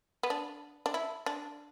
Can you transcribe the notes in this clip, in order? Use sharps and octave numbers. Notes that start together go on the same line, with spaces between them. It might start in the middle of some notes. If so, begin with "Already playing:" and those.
B3
D4
D4
E4
D4